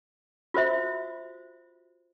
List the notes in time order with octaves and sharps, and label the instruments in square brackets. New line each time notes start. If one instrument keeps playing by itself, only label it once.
[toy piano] F4 F#4 C5 E5